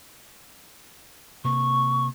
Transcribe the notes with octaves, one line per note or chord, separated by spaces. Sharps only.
C3 A#3 C#6